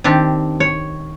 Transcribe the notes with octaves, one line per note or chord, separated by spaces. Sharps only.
D#3 C4 D4 G4
C#5